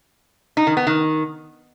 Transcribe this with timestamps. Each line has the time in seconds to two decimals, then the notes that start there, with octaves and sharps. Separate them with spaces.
0.57 D#4
0.67 D#3
0.77 B3
0.87 D#3